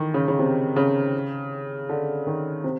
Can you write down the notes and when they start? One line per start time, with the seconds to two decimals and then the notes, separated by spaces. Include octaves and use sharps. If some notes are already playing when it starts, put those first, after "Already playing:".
Already playing: D#3 E3
0.14 C#3
0.28 C#3
0.39 C3
0.76 C#3
1.89 D3
2.27 D#3
2.64 C3